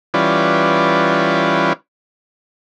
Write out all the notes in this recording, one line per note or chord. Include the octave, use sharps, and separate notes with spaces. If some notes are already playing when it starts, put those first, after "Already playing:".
E3 G3 C#4 F4 B4 D5